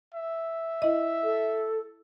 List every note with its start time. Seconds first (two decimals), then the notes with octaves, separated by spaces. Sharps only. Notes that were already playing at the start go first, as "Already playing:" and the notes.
0.15 E5
0.82 E4 D#5
1.23 A4